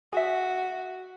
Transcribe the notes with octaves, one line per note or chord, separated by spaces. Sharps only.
F#4 G#4 E5